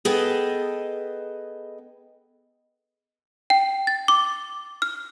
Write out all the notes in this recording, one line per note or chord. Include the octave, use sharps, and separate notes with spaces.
B3 G#4 A4 D#5 G5
G5
A6
D6
F6